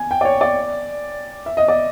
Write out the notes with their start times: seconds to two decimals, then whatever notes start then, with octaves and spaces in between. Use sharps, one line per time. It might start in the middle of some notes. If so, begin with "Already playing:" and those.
Already playing: G#5
0.11 G5
0.21 D5
0.25 C#5
0.41 D5
1.46 E5
1.57 D#5
1.68 D5